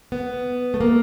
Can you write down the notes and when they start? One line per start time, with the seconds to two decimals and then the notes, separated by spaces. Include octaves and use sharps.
0.12 B3
0.74 A3
0.81 A#3